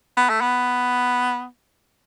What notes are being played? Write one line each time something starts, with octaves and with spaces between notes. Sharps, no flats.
B3
A3
B3